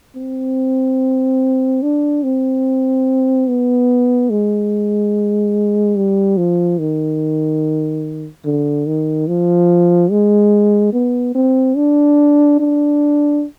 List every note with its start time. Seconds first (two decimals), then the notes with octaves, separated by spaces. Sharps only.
0.16 C4
1.82 D4
2.23 C4
3.48 B3
4.30 G#3
5.96 G3
6.37 F3
6.79 D#3
8.45 D3
8.87 D#3
9.28 F3
10.11 G#3
10.93 B3
11.35 C4
11.77 D4
12.60 D4